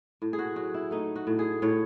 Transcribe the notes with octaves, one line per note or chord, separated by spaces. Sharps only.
A2
G#4
F#4
F#3 F#4
E4
A3 D#4
F#4
A2
G#4
A2 C#5